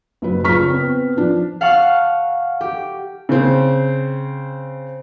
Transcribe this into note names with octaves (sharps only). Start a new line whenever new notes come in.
F#1 F#3 B4
A#1 C#3 A#5 C#6 F6 B6
B3 C4 B4
F3 D4
F5 F#5 A5 C#6 F6 F#6
G4
C#3 C4